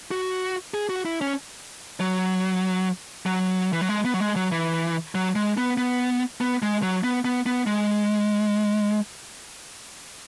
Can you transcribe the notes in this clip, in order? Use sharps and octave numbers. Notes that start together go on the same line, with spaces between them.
F#4
G#4
F#4
E4
C#4
F#3
F#3
E3
F#3
G#3
B3
F#3
G#3
F#3
E3
F#3
G#3
B3
B3
B3
G#3
F#3
B3
B3
B3
G#3